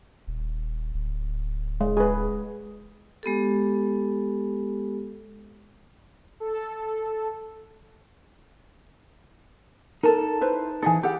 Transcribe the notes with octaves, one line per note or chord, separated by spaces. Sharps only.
D#1
D1
G#3
G#4 B4
G#3 B3 G4 A4
A4
D#4 A4 A#4 A5
E4 B4 C5
E3 D#4 G#4 A4 G#5
E4 G4 G#4 F#5